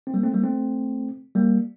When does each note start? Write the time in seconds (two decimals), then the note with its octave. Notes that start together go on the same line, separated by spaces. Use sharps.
0.07 C4
0.14 G3 A#3
0.23 A3 C4
0.33 G3 A#3
0.44 A3 C4
1.35 G3 A#3